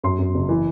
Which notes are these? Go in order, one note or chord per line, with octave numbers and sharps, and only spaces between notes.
F#2 C6
F#2
F#1
E3